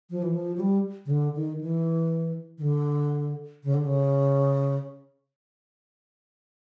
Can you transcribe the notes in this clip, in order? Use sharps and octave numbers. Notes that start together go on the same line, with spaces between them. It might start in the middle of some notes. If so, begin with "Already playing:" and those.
F3
E3
F3
F#3
G3
C#3
D3
D#3
E3
D#3
D3
C#3
D3
C#3